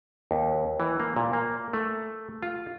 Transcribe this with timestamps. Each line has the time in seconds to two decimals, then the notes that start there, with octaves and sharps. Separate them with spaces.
0.31 D#2
0.80 E3
1.00 A#3
1.16 A#2
1.33 A#3
1.73 A3
2.43 F4